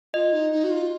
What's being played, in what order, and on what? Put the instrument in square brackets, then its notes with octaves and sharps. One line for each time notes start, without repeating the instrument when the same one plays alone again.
[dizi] F4 [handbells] D#5
[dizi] D#4
D#4
F#4
F4